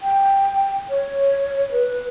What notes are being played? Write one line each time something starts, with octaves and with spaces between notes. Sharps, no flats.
G5
C#5
B4